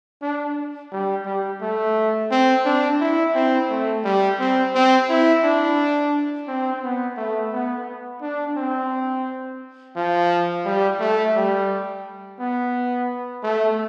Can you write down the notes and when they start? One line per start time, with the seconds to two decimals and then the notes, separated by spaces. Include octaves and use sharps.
0.22 D4
0.92 G3
1.26 G3
1.61 A3
2.31 C4
2.65 D4
3.01 E4
3.35 C4
3.69 A3
4.05 G3
4.39 C4
4.75 C4
5.09 E4
5.44 D4
6.47 C4
6.83 B3
7.17 A3
7.53 B3
8.22 D4
8.57 C4
9.96 F3
10.65 G3
11.00 A3
11.35 G3
12.39 B3
13.43 A3